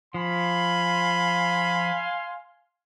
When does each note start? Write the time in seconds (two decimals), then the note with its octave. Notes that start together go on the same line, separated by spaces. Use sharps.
0.14 F3 F5 G#5 B5 C6